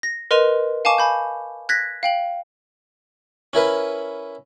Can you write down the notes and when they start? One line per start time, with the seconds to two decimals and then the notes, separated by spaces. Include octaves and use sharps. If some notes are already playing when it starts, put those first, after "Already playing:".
0.03 A#6
0.31 A#4 B4 D#5 C6 D#7 F7
0.85 F5 G#5 A5 C#6 D6 E7
0.98 G#5 B5 G6
1.69 F#6 G#6 A#6 B6
2.03 F5 G5 F#7
3.53 C#4 E4 A#4 B4